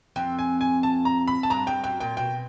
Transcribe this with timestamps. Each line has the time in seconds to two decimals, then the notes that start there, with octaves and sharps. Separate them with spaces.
0.16 F2 G5
0.39 G#5
0.61 G#5
0.83 A5
1.05 A#5
1.28 B5
1.43 A5
1.50 G2 A#5
1.67 G2 G5
1.84 F#2 G5
2.00 A#2 G5
2.17 B2 G5